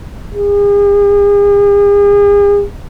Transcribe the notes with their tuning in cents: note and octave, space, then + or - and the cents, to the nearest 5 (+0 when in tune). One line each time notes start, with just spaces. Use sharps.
G#4 -40